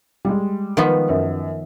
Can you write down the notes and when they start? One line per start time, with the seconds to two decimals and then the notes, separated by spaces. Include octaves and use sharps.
0.25 G3 G#3
0.77 D#3 F3 B3
1.09 F#2